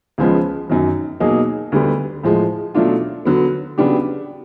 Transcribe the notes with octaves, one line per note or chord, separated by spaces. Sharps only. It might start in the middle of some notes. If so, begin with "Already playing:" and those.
C#2 C#3 F3 G#3 B3
F#2 D#3 F#3
B2 F#3 A#3 D#4 G#4
D2 D3 G3 B3
A2 F3 G#3
B2 F#3 A3 D4 F4
D3 F#3 B3
C#3 F#3 B3 D4 G4